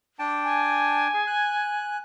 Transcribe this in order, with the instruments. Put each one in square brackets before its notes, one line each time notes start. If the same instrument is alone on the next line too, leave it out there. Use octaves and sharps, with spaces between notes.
[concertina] D4 G5 A5
[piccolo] G#5
[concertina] G#4
F#6